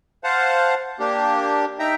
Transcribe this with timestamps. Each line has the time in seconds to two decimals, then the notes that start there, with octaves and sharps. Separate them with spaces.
0.24 C5 F5 F#5 A5
1.00 A#3 D4 G4
1.79 D#4 E5 G5 A#5